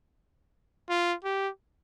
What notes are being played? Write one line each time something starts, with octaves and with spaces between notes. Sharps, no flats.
F4
G4